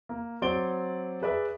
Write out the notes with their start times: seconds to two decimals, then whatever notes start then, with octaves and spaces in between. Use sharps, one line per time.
0.09 A#3
0.42 F#3 C4 D5 C6 D7 G7
1.22 G#4 B4 D5 E5